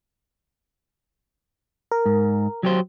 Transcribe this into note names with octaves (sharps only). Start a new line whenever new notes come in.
A#4
G#2
F#3 G4 C5